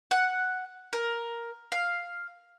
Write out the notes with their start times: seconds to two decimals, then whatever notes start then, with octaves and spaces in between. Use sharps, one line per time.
0.11 F#5
0.93 A#4
1.72 F5